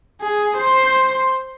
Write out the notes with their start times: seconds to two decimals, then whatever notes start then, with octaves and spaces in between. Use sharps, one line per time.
0.21 G#4
0.57 C5 C6